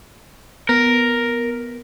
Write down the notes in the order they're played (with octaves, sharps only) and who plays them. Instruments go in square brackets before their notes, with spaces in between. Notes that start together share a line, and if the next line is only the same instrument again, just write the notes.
[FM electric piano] B3 [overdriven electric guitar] A#4